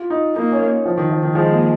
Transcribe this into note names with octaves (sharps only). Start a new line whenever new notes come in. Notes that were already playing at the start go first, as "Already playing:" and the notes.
Already playing: F4
D#4
A#3 D#4
C#4
F3
D#3
F3
D#3
F3 G#3
A#3